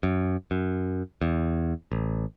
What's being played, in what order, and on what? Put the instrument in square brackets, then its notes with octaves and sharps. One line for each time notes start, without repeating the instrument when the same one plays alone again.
[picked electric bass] F#2
F#2
E2
A1